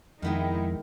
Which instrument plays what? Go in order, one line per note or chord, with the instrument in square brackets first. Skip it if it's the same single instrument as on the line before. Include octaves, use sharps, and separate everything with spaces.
[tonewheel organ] F2 [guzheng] D#3 B3 G5 [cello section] G#3 D#4 E4